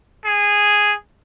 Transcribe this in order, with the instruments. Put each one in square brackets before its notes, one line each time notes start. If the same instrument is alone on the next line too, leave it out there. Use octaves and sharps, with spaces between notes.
[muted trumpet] G#4